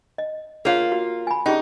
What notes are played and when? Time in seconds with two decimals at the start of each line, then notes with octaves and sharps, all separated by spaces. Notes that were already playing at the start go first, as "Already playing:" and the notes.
0.18 D#5
0.65 A#3 F4 G#4 C#5 F5
0.92 F#4
1.27 G#5 B5
1.46 C#4 D#4 G4 G#4